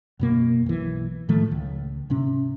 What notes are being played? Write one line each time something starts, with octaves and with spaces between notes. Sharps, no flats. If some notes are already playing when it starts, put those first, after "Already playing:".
F#2 B2 A#3
B1 E3
A2 D#3 F3 A3
C#2
G#2 C3 C#4